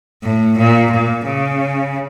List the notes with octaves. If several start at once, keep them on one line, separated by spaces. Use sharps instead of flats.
A2
A#2
A#2
C#3